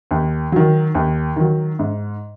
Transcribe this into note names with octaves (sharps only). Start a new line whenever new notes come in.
D#2
D#3 F#3
D#2
D#3 F#3
G#2